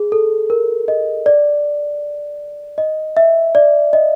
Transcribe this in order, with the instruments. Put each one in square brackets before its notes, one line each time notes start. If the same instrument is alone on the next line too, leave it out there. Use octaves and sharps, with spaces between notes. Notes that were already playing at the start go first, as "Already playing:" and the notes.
Already playing: [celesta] G#4
A4
A#4
D#5
D5
D#5
E5
D5
D#5